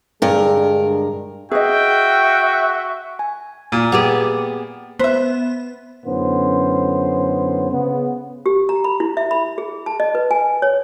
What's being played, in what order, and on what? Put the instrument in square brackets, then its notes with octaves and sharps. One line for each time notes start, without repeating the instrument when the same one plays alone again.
[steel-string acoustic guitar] G2 A#4 [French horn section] D3 G#3 G#4
[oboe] F#4 [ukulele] G#4 D#5 [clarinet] E5 [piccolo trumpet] G5
[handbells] G#5
[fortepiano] A#2
[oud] B3 G4 G#4
[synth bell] B3 [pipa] C5 E5
[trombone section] F#2 A2 D3 B3 C#4 C5
C#3 B3
[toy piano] G4
A#5
B5
E4
E5
B5
G#4
A5
D#5
B4
G#5
C#5